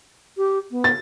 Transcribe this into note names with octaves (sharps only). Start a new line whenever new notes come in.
G4
B3
A6